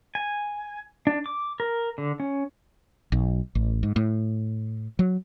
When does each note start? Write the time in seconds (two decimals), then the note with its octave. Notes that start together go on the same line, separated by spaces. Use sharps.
0.15 G#5
1.07 D4
1.26 D6
1.60 A#4
1.98 D3
2.20 C#4
3.12 B1
3.55 A1
3.83 G#2
3.96 A2
4.99 F#3